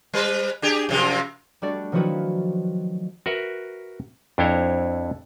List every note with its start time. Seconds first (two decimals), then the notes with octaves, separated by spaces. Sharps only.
0.14 G3 B4 C5
0.62 D4 G4 G#4
0.89 F#2 C3 F3
1.62 G3 A3 D4 F#4 D5
1.92 D#3 F3 F#3 E4 F#4 B4
3.26 F#4 A#4 B4 E5
4.38 F2 D4 E4 C5 C#5 A#5